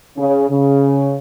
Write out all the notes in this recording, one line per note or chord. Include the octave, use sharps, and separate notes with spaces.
C#3
C#3